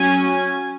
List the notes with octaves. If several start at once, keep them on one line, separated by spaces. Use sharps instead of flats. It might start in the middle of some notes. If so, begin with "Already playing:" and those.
Already playing: F#3 C#4 G#5